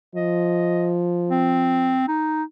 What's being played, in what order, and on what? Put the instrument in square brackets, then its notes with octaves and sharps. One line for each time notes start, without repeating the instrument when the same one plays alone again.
[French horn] F3 [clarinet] D#5
[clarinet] C4
D#4